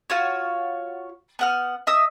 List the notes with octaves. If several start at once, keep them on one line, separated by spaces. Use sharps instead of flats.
F4 F#4 C#5
B3 F#5 F6
D#5 E5 D#6 E6